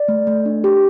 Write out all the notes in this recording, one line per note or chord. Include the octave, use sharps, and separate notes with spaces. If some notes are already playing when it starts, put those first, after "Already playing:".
Already playing: D5
A3
A3
D4
G4